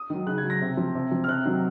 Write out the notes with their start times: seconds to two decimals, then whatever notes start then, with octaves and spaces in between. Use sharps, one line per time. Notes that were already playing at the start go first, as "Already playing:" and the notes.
Already playing: D#6
0.10 D#3 F#3
0.27 C#3 F#6
0.38 G#6
0.43 F#3
0.50 A#6
0.61 C3
0.77 F3
0.95 C3
1.11 F3
1.24 F6
1.28 C3 F#6
1.45 D#3 F#3